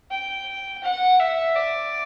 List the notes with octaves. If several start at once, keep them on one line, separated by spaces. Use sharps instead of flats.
G5
F#5
E5
D5